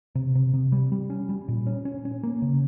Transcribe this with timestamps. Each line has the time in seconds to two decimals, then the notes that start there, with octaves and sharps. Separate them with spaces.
0.15 C3
0.35 C3
0.54 C3
0.72 G3
0.92 G3
1.10 C#4
1.29 G3
1.48 A#2
1.67 C#4
1.85 C#4
2.05 C#4
2.23 A#3
2.42 C#3